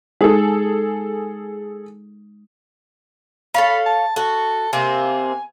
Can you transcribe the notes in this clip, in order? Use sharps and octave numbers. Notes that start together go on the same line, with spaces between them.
G#3 D#4 G#4 A4
A4 C#5 F5 B5
A5
F#4 A4
C3 A#3 C4 G#5